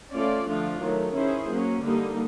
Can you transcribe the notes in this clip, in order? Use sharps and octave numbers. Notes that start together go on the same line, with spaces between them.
A3 C#4 F4 A4 D5
D3 F3 A3 D4 F4
D#3 F#3 A3
C#4 E4 G#4 C5
F#3 A#3 C#4
D3 G3 A#3 D#4